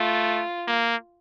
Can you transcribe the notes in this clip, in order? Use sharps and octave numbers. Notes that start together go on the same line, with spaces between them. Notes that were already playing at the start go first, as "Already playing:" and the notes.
Already playing: A3 F4
A#3